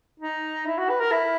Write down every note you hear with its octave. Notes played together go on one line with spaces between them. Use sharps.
D#4
E4
F#4
B4
A#4
E4